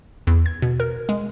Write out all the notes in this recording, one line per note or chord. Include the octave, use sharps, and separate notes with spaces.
E2
G#6
B2
A#4
G#3